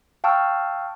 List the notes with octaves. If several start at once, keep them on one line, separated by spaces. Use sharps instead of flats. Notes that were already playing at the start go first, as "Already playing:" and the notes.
F5 G5 A5 C#6 E6 F6